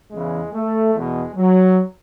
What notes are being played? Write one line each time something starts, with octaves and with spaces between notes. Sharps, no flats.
E2 C#3 E3 G#3
A3
E2 B2 G#3
F#3